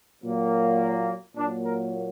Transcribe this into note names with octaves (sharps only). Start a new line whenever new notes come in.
A#2 F#3 A#3
A#2 F#3 A#3 D4
A#4